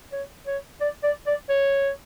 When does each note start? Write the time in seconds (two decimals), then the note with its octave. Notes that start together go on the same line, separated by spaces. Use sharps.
0.12 C#5
0.47 C#5
0.81 D5
1.03 D5
1.26 D5
1.49 C#5